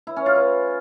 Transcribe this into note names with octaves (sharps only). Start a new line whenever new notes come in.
E4
C#4
F4
B4